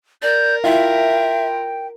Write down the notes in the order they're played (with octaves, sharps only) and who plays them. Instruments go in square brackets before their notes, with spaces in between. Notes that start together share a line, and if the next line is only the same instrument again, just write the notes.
[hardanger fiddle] A#4 [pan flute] D5 [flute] G6
[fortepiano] E4 F4 [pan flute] E5 [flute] G5